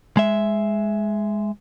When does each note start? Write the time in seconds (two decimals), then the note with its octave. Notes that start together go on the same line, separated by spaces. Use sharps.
0.17 G#3 E5